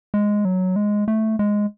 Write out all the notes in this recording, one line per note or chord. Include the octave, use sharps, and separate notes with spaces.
G#3
F#3
G#3
A3
G#3